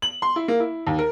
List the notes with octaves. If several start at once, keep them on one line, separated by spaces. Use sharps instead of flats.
F#7
C6
E4
A#3
E4
D#2
A#4